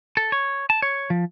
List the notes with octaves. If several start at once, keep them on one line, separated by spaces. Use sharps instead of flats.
A4
C#5
A5
C#5
F3